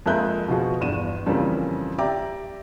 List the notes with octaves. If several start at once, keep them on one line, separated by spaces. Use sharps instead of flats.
F2 G#3 A#3 E5 F#6 G6
B2 F3 F#4 G#4
G1 E2 D4 D#7 E7
F2 C#3 E3 G3 A#3 C4
G4 D5 E5 G5 A#5 D6